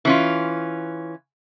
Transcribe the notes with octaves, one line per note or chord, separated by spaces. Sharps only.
E3 C#4 F4